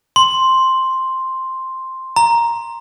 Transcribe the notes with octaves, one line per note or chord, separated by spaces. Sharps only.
C6
A#5